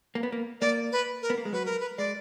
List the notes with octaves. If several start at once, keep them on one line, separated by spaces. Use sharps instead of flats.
A#3
B3
A#3
A#3 D5
B4
A#4
B3
A#3
G#3
F#3 B4
A#4
B4
G#3 D5